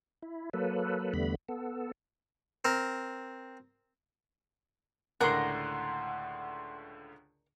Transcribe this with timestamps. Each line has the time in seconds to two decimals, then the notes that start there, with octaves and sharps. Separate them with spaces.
0.22 E4
0.53 F#3 A#3 A4 B4
1.14 E2 D3 G3 A3 B3 B5
1.48 B3 A4
2.65 C4 A#4
5.21 C#2 A2 D3 A#4 D5 F#5 A#5 C6